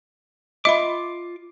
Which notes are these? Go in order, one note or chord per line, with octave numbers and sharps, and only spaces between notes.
F4 D#5 E5 B5 D6